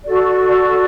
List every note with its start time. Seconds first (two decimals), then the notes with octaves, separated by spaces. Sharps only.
0.05 F#4 A4 D5